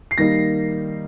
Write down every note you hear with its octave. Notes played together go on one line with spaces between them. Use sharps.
C7
D#3 G3 A#3 D#4 A#6